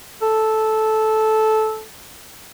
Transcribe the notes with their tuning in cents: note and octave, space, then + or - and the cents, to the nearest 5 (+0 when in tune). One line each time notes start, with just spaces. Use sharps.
A4 -10